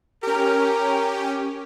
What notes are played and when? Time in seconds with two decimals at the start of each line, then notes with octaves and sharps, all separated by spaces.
0.23 C#4 G4 A#4